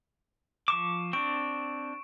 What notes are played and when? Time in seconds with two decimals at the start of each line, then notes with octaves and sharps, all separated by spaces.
0.68 F3 C#6 D6 E7
1.13 C4 D4 C#6 D7